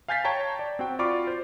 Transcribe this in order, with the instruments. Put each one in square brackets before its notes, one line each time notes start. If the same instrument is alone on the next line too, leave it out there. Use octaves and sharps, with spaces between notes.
[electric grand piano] F5 G#5 G6 A6 B6 C7
C#5 G5 A5 A#5
D5
C4 F#4 G5
F4 F#4 D5 B5 C#6 D6
C5